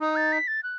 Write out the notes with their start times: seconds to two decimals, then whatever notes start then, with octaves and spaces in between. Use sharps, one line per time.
0.01 D#4 D#6
0.16 A6
0.33 B6
0.47 A6
0.63 F#6